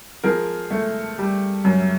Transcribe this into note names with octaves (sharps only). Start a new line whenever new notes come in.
F3 G#4 A#4
A3
G3
F#2